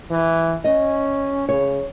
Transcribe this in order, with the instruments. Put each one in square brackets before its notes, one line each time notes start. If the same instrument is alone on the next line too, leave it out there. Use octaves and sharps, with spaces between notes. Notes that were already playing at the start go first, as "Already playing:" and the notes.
[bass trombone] E3
[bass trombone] C#4 [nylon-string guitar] D#5
[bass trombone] C#3 [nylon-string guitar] C#5